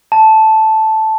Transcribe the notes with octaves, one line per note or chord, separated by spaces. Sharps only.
A5